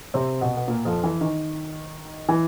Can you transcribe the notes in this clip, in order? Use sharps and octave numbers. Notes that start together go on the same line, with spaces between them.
C3 C4
B2 B3
B3
A#2 A#3
F2 F3
E3
D#3
E3